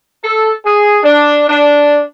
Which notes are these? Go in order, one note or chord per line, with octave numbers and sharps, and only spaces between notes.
A4
G#4
D4
D4